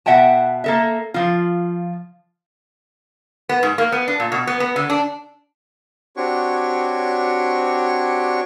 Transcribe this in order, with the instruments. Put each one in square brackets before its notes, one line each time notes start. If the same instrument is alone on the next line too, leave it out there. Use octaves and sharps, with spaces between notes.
[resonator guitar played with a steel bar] B2 E5 F#5 G5 A5
A#3 A4 E5
F3 F4
B3
G#2
A#3
B3
D4
A#2
B2
B3
B3
D3
D4
[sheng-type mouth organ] C4 D4 F#4 G4 C#5 C#6